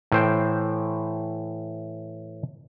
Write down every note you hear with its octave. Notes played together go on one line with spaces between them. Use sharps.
A2 E3 C5 G5